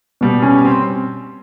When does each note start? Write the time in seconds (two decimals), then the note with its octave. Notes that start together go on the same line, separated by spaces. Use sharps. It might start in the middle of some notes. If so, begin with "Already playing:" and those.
0.21 B2 G3
0.42 C#4
0.65 C4